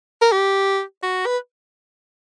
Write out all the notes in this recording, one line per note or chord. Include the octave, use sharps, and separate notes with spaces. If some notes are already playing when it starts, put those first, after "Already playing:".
A#4
G4
F#4
B4